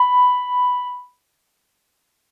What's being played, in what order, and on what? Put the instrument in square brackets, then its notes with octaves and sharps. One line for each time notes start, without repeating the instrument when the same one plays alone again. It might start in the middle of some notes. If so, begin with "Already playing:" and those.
Already playing: [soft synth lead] B5